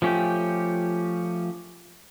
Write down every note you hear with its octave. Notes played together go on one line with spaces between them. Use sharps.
F3 A3 C#4 G4